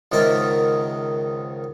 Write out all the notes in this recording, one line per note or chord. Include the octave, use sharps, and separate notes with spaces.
C#2 G#2 D#3 A#4 E5 A5